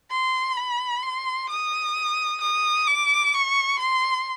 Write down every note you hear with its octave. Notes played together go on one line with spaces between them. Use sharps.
C6
B5
C6
D#6
D#6
D6
C#6
C6